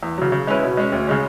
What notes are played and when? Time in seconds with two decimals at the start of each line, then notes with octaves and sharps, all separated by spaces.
0.03 E2
0.18 C#3 F#3
0.32 C#3
0.47 G#3 C#4 E4 B4
0.63 B2
0.77 G#3 C#4
0.92 D2
1.07 C#3 G#3 C#4